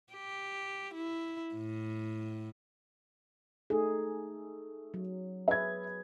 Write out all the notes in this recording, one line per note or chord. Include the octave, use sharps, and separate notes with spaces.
G4
E4
A2
A3 D#4 G#4
F#3
G#4 B4 E5 G#6